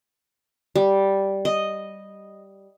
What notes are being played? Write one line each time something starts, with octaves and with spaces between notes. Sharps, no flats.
G3
D#5